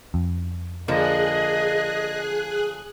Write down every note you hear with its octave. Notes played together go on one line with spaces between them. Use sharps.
F2
D3 F3 A#3 G#4 D#5 F#6